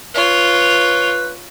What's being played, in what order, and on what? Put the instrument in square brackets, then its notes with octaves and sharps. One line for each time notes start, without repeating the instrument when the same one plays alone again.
[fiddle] F4 C#5 [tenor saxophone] B4